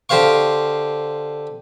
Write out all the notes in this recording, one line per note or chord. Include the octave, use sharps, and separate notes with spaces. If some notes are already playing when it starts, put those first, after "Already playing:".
D3 G4 C5 F5 C#6